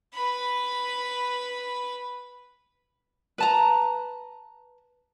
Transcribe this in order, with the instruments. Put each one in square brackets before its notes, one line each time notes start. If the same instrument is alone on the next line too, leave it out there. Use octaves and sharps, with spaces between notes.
[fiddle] B4 B5
[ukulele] B4 A5 A#5